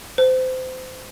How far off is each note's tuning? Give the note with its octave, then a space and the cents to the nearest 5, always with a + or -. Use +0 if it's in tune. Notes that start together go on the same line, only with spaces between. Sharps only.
C5 -25